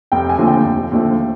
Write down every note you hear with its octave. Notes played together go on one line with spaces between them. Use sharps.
F1 G5
G#5
D#2 D3 F3 A3
G5
F1
D#2 D3 F3 A3